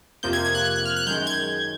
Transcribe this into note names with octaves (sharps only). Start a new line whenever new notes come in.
F2 C3 F3 A#3 G6
G#6
G#6
F#6
F#6
F#6
F6
F#6
F#2 D#3 G#3 G6
G#6